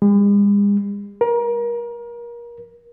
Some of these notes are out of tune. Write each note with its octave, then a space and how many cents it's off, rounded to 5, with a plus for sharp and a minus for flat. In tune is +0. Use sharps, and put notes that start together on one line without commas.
G#3 -45
A#4 +30